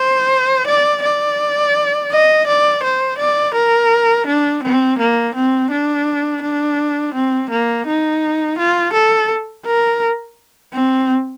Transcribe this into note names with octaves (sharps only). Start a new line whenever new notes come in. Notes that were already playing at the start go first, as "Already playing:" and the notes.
Already playing: C5
D5
D5
D#5
D5
C5
D5
A#4
D4
C4
A#3
C4
D4
D4
C4
A#3
D#4
F4
A4
A#4
C4